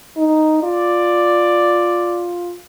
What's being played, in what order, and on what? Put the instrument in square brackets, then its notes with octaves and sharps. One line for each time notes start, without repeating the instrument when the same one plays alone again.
[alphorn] D#4
[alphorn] F4 [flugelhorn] D5